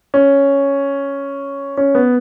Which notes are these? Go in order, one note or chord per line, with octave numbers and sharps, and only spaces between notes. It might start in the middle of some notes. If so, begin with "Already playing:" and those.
C#4
C#4
B3